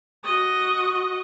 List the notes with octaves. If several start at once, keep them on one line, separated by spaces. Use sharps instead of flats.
F#4 D#5